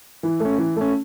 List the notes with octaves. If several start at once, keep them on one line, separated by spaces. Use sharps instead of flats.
E3
A3 C#4
E3
A3 C#4